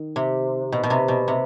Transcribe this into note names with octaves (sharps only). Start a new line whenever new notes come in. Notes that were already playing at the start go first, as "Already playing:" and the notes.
Already playing: D#3
C3
B2
B2
C3
B2
C3